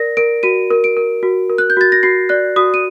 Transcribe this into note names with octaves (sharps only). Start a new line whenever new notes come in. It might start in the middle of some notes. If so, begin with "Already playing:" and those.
Already playing: A#4 D5 A#6
A#4 D7
F#4 D#7
A#4
D7
A#4
F#4
A#4
F#6
G6
F#4 A6
A#6
F#4 C7
D5 F#6
F#4 D#6
D#7